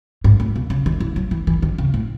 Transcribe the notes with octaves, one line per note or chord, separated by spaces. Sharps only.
G#2
A2
B2
C#3
D#3
E3
F#3
E3
E3
D#3
C#3
A2